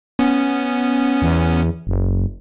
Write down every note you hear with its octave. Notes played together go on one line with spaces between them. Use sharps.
B3 C#4
E2
F#1